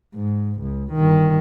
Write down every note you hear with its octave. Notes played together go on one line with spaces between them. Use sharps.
G#2
C#2
G1 D#3